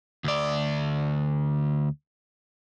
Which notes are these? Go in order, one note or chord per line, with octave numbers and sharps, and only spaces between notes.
D2 D5